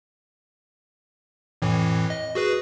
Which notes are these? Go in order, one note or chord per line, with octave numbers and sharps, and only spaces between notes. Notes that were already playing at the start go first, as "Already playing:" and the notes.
F2 A2 E3
D#5
F#4 G#4 B4